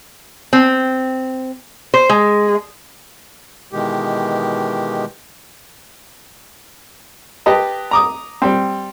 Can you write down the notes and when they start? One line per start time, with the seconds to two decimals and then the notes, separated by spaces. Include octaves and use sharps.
0.53 C4
1.94 C5
2.09 G#3
3.73 B2 D#3 E3 G#3 G4
7.46 G4 B4 D#5 A5
7.91 A#5 D6 D#6
8.42 G3 C4